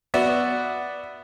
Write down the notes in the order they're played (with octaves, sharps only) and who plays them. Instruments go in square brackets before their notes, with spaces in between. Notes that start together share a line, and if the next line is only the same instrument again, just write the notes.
[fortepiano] B3 F#4 D5 E5